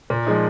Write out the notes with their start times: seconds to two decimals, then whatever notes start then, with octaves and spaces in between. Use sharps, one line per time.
0.10 A#2
0.26 F3 G#3 D#4